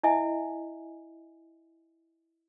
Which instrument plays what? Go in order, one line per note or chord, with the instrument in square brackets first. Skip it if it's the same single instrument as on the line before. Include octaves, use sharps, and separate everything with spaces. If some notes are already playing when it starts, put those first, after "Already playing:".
[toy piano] E4 D#5 E5 G#5